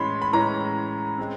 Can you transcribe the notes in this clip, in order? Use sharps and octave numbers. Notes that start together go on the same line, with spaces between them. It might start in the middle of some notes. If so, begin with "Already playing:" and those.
Already playing: A2 E3 G#3 C#4 B5 C6
B5
A2 E3 G#3 C#4 A#5
G#3 C4